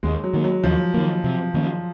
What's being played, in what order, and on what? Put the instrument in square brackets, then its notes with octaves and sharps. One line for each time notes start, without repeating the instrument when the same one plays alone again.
[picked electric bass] D#2 [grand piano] G#3
[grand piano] F#3
[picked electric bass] D#3 A#3
[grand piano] F#3
[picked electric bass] D#2 [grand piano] F3
[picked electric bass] D#3 A#3
C3
D#3 A#3 C#4